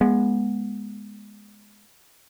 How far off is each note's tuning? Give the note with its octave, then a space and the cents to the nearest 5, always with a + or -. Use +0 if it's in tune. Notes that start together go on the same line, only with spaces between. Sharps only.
G#3 +0 B3 -25